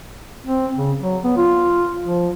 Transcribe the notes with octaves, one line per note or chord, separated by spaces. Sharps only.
C4
C#3
F#3
B3
F4
F3